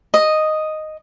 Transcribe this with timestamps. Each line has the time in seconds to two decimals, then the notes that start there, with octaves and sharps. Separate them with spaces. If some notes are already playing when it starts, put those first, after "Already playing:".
0.14 D#5